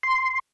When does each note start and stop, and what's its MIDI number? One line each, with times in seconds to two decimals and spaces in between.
0.03 0.39 84